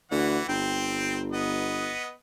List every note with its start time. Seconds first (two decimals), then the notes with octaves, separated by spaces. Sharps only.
0.11 D2 E3 F#5
0.49 G1 C4 G5
1.33 B3 D#5